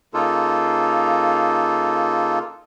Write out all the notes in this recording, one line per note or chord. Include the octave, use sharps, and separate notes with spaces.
C#3 A#3 D#4 F4 A4